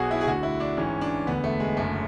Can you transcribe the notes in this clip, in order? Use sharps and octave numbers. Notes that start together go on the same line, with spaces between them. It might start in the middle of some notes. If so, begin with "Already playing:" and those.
Already playing: B1 B2 F#4 G#4
E4
G#4
D2 D3 F#4
E4
D4
A1 G#2 E3 C#4
D4
E1 D2 D3 B3
A3
G#3
F#1 F#2 D3 A3